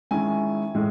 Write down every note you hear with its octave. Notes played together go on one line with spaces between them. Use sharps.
D#3 G#3 C#4 E4 G#5
A2 G#3